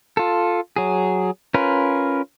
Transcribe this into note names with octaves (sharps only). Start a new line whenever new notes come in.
F4 A4
F#3 G#4
C#4 F4 A#4 B4